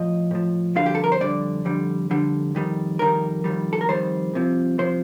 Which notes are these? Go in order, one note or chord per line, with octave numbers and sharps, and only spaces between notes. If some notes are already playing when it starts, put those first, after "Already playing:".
Already playing: A2 F3 D#5
A2 F3
F2 D3 G3 F5
G4
A4
A#4
C5
F2 D3 G3 D5
F2 D3 G3
F2 D3 G3
F2 D#3 G3
F2 D#3 G3 A#4
F2 D#3 G3
A4
A#4
F2 D#3 G3 C5
C2 C3 F3
C2 C3 F3 C5